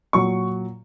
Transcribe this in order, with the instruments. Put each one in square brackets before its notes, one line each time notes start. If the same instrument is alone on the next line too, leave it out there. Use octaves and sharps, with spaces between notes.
[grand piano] A#2 F#3 C#6